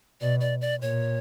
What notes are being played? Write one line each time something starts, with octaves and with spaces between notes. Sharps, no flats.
B2 D5
D5
D5
A#2 C#5